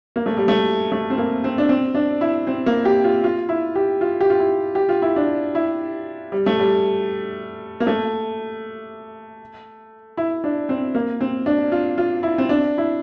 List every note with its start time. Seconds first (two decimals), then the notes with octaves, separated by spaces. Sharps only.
0.16 A#3
0.26 A3
0.37 G3
0.48 A3
0.92 A3
1.10 C4
1.18 A#3
1.44 C4
1.58 D4
1.69 C4
1.95 D4
2.21 E4
2.47 C4
2.66 A#3
2.85 G4
3.04 F4
3.24 F4
3.49 E4
3.75 G4
4.01 F4
4.21 G4
4.30 F4
4.39 E4
4.75 G4
4.89 F4
5.02 E4
5.16 D4
5.55 E4
6.32 G3
6.46 A3
6.59 G3
7.80 A#3
7.87 A3
10.17 E4
10.44 D4
10.69 C4
10.95 A#3
11.21 C4
11.46 D4
11.72 F4
11.98 F4
12.23 E4
12.38 C4
12.49 D4
12.78 E4